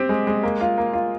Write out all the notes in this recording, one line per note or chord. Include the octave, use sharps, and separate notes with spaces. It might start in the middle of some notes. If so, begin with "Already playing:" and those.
Already playing: C4 G4
G#3
G#3
A#3
F4
A#3
F4